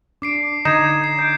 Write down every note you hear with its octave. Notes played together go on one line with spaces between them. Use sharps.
D4 D6 C7 D7
D3 D#4 G#6 C7 E7
C7
G6 D7